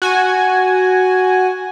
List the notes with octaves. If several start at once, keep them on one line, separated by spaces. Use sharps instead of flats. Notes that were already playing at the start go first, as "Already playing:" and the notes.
F#4 G#5